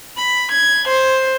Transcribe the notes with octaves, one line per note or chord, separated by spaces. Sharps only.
B5
G#6
C5